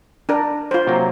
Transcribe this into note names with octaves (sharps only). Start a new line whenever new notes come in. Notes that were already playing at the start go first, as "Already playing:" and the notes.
D4 A#4
F4 C5
C3 F#3 A#3